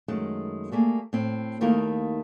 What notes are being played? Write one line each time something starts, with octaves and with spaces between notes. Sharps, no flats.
F#2 D#3 G#3 A3
G3 A3 A#3 G#4
A2 C4
D#2 D#3 A3 A#3 E4 A#4